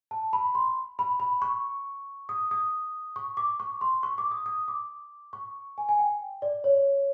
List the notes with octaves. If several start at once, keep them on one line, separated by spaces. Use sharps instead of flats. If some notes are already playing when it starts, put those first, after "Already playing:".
A5
B5
C6
B5
B5
C#6
D#6
D#6
C#6
D6
C#6
C6
C#6
D6
D#6
D#6
D6
C#6
G#5
G#5
G5
D5
C#5